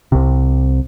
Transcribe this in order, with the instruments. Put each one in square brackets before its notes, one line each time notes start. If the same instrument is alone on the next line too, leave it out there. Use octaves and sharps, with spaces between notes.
[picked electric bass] C2 C3